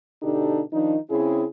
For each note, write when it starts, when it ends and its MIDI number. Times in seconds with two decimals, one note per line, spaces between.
0.22 0.61 47
0.22 0.61 50
0.22 0.61 62
0.22 0.61 63
0.22 0.61 67
0.22 0.61 69
0.73 0.97 51
0.73 0.97 53
0.73 0.97 62
0.73 0.97 63
1.10 1.44 49
1.10 1.44 60
1.10 1.44 61
1.10 1.44 64
1.10 1.44 68